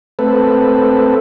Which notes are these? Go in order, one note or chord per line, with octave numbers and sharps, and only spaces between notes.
A3 C4 A4 B4